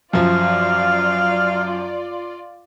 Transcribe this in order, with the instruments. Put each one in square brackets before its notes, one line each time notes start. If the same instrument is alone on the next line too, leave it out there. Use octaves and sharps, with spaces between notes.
[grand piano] F#2 F3 [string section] F4 D5 [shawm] F5